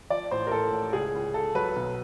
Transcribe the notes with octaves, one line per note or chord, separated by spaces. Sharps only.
F3 D5
A1 C5
A#4
A1 A4
A1
C#2 G#4
C#2
C#2 A4
F#3 B4
B1